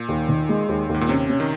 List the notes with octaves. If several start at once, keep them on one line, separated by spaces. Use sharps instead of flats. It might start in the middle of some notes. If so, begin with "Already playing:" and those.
Already playing: A#2
D#2
D#3
G#3
D#2
D#2
G#2
A#2
C3 C#4
C#4
D#3